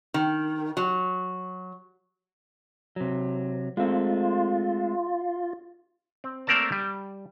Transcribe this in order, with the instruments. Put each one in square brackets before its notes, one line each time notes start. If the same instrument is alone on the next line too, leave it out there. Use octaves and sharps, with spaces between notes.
[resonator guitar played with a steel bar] D#3
F#3
[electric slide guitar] C3 F#3
[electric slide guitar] G#3 A3 C4 [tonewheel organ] F4
[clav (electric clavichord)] C4
A3 A#3 C4 A#4 D5 A5
G3